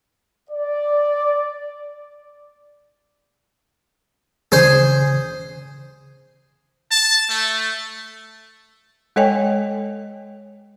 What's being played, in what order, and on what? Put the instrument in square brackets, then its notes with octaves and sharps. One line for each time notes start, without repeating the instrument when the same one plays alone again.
[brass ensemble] D5
[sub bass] C#3 [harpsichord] G#4 C5
[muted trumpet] A5
A3
[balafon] G#3 A4 C#5 D#5 G5 G#5